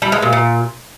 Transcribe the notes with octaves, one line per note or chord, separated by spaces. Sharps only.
G3
G#3
A#2
A#2